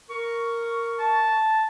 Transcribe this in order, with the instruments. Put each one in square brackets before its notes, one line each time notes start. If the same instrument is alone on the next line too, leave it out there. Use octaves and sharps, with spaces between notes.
[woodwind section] A#4 C#6
[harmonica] A5